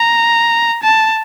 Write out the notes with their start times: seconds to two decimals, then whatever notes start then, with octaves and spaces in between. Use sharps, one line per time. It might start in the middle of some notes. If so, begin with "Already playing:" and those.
Already playing: A#5
0.83 A5